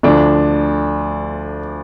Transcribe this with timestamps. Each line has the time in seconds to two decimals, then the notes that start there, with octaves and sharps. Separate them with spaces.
0.03 D2 D3 F3 D4